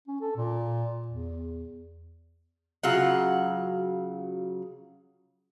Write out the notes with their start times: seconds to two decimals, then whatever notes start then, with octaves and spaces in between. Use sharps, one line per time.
0.08 C#4
0.21 A4
0.37 A#2
1.08 E2
2.83 C#3 F#3 F4 F#5